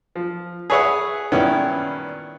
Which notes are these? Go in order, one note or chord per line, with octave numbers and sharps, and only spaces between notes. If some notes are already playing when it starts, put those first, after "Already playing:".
F3
G#4 B4 C#5 E5 F#5
G2 A#2 D#3 B3 C#4 E4